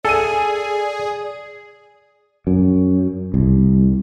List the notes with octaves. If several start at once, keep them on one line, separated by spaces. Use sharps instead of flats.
G#4 A4 D5 G#5 D#7
F#2
C2